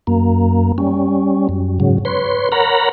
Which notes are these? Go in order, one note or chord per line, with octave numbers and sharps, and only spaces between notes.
F#2 A#3
G3 C#4
F#2
G#2 C#3 F#3
B4 C#5 C6
A#4 C#5 F#5 A#5 B5